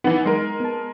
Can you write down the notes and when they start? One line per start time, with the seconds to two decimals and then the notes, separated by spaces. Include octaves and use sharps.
0.04 E3 B3 D#4
0.26 G#3 A#4
0.60 B3 A5